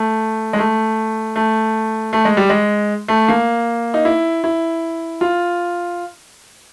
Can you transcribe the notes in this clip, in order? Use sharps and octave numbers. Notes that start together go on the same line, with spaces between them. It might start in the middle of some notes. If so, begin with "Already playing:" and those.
Already playing: A3
G#3
A3
A3
A3
G#3
G3
G#3
A3
A#3
D#4
E4
E4
F4